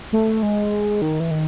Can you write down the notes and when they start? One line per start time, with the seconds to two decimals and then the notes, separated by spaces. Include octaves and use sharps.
0.13 A3
0.43 G#3
1.02 D#3
1.20 E3
1.31 D#3